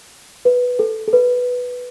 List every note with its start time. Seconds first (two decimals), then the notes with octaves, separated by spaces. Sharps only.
0.45 B4
0.79 A4
1.08 A4
1.13 B4